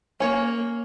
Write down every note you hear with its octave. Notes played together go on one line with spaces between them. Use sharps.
A#3 C#4 C#5